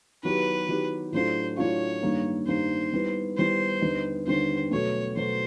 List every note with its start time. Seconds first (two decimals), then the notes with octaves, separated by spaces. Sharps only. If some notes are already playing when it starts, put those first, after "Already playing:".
0.23 D#3 F#3 B3 E4 G4 B4
0.68 D#3 F#3 B3 E4 G4
1.12 A2 F#3 A3 D4 F4 C5
1.57 A2 F#3 A3 D4 F4 C#5
2.03 G2 D#3 G3 A#3
2.47 G2 D#3 G3 A#3 C5
2.92 D#3 G3 B3 E4
3.37 D#3 G3 B3 E4 C5
3.81 D#2 D3 G3 B3 D#4
4.27 D#2 D3 G3 B3 D#4 C5
4.71 B2 F#3 A3 C#5
5.16 B2 F#3 A3 C5